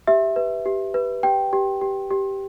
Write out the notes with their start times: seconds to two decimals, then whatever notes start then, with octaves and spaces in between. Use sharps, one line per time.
0.07 G4 E5
0.36 B4
0.66 G4
0.94 B4
1.23 G4 G5
1.53 G4
1.82 G4
2.11 G4